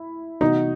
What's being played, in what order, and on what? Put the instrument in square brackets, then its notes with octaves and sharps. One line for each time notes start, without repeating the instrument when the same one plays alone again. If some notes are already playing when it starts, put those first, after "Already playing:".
Already playing: [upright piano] E4
[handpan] C3 E3 G3 B3 F#4 [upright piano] D#4